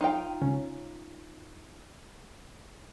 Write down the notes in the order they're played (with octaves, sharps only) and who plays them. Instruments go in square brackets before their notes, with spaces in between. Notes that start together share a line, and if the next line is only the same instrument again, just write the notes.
[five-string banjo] D#4 F4 G5
[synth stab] C#2 C#4